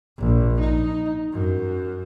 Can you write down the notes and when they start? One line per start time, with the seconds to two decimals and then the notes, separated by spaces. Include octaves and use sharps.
0.19 A#1
0.59 D#4
1.32 F#2